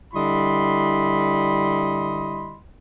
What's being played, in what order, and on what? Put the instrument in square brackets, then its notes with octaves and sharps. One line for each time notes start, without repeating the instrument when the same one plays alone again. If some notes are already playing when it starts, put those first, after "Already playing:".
[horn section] D3 G3 E4 D#5 B5 C6